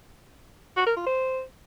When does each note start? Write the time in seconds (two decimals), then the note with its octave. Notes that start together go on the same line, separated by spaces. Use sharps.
0.77 F#4
0.87 A#4
0.97 F4
1.07 C5